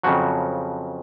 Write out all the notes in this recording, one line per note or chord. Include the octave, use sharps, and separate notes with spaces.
F2 C#3 F3 F#3 F#4